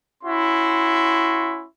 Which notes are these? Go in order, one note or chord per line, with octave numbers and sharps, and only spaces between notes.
C#4 E4 F#4 C6